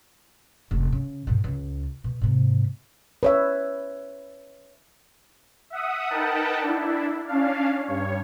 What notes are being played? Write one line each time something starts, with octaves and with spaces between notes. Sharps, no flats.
F1 A#3
C#3
G2 B2
C#2
B2
G#2 C3
B4 C#5 E5
E5 F#5 D#6
D#4 A#4 B4 F#5 G5 A5
D4 E4
C#4 D4 F5
G2 C#5